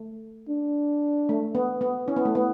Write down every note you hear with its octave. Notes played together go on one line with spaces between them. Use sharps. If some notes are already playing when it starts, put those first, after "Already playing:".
Already playing: A3
D4
A3
B3
B3
C#4 E4
B3
A3
B3